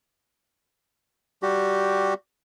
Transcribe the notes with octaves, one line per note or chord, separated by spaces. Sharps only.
G3 F#4 G4